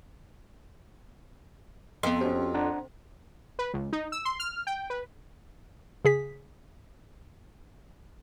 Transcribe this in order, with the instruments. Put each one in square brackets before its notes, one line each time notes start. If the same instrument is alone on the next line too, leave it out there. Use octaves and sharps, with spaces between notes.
[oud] F2 [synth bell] B3 D#5 [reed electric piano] C6
[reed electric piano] C#4 F#4 G4 [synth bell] C5
[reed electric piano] D4 F#5 A#5
[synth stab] B4
C#2
D#4
E6
C6
F6
G5
B4
[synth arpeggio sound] C#3 G#4 B6